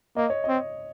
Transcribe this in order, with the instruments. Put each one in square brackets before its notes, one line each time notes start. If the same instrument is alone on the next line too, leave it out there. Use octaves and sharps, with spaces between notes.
[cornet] A#3 [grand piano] D#5
[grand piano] C#5
[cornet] C4 [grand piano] D#5